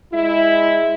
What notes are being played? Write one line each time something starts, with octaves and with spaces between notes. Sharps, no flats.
G#3 E4